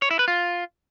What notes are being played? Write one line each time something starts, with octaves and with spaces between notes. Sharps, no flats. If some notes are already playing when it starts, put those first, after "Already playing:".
C#5
E4
B4
F4